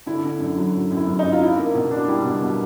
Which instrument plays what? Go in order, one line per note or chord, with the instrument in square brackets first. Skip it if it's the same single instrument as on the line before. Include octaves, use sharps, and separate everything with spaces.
[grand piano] D3 [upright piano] E4
[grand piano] D3
F#2
F#3
F#2
F#2
[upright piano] E4
[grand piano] F#2
[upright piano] D#4
[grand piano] F#2
[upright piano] F4
[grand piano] D4 [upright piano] E4
[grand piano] A#3
B2
D4
[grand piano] G3 [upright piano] E4
[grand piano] B2
B2